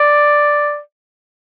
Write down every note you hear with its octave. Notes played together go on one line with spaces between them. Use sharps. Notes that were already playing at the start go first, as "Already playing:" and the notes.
Already playing: D5